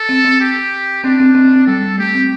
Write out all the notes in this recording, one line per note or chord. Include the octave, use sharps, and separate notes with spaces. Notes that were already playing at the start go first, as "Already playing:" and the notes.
Already playing: A4
C4
C4
G4
C4 D4
C4
C4
C4
C4
G3 A4
G3
A3 G4
C4